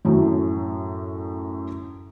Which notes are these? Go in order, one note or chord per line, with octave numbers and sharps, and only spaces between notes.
F#2 A2 F#3